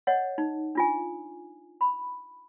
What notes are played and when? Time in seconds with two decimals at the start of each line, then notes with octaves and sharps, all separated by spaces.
0.07 C#5 D#5 F#5
0.38 D#4
0.75 D4 F4 G#5
1.81 B5